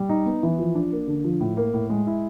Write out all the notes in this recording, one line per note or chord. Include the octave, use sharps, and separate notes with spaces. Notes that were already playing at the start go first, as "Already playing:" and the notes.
Already playing: G3
D#4
B3
E3
F3
D4
A#3
D3
F3
A2
A#3
A2
G#3
E4